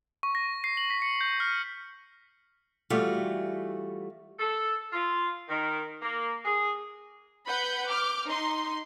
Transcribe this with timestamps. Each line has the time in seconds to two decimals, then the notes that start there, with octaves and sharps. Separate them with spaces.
0.23 C#6
0.35 A#6
0.64 C7
0.77 F#7
0.90 B6
1.02 C#7
1.21 G6
1.40 F6
2.90 E3 G3 A3 F4 F#4
4.40 A4
4.92 F4
5.49 D#3
6.02 A#3
6.44 G#4
7.47 B4 F#5 B5 G6
7.89 D6 F6 G6
8.26 D#4 C6